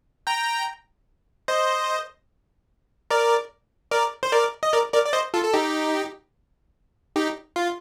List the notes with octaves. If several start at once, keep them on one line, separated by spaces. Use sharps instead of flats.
G5 A#5
C5 D#5
A#4 D5
A#4 D5
C5
A#4 D5
D#5
A#4 D5
A#4 D5
D5
C5 D#5
F4 A4
A4
D#4 G4
D#4 G4
F4